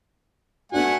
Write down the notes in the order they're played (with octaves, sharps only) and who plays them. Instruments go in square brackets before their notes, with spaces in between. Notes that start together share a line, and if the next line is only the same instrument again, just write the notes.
[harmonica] A3 F#5 G#5 [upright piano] B3 D4 F#4